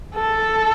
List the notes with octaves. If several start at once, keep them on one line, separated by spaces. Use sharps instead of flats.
A4